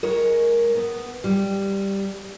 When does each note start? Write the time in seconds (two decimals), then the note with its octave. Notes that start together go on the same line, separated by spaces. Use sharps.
0.03 G#3 A#4 C#5
0.75 B3
1.24 G3